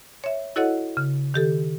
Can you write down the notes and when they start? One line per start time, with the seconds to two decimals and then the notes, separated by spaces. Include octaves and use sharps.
0.24 C#5 E5
0.56 E4 F#4 A4 C#5 D#5 F#5
0.97 C#3
1.34 D#3 G4 A4